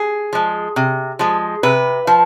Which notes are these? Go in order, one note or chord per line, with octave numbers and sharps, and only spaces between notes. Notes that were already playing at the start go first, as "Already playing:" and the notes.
Already playing: G#4
F3 G#3
C3
F3 G#3
C3 B4
F3